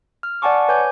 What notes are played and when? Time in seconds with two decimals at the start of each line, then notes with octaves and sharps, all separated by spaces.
0.23 F6
0.42 D5 F#5 G#5 A5 C#6 D6
0.69 B4 C#5 G#5 D6 G6 G#6